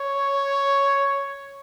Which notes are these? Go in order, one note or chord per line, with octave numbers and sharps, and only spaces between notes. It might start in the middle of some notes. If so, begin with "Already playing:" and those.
Already playing: C#5